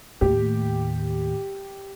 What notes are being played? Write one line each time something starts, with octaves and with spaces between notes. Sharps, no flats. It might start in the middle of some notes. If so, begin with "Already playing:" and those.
D#2 A2 G4